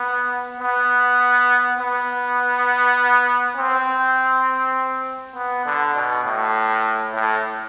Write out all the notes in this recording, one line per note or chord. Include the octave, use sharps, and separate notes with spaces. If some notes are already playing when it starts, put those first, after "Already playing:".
Already playing: B3
B3
B3
C4
B3
D3
B2
A2
A2